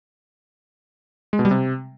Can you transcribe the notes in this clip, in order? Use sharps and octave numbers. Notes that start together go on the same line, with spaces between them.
G#3
B2
G3
C3